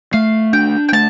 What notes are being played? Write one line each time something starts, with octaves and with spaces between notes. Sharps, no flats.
A3 F5
D4 G5
G5
A3 A5